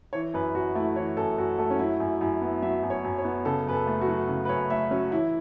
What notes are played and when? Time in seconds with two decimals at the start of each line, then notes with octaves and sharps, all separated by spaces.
0.13 E3 C#5
0.34 F#2 B4
0.54 F#2 F#4
0.75 A3 E4
0.96 E3 C#5
1.17 F#2 A4
1.38 F#2 F#4
1.59 A3 A4
1.70 C#4
1.79 F#3 E4
2.00 F#2
2.21 F#2 E4
2.41 B3
2.62 F#3 E5
2.83 F#2
2.90 C#5
3.04 F#2
3.18 C#5
3.25 B3
3.45 C#3 A4
3.66 F#2 B4
3.73 A4
3.87 A3
4.01 F#4
4.08 F#3
4.28 C#3
4.45 B4
4.49 F#2 C#5
4.70 A3 E5
4.91 F#3 C#4
5.12 E3 E4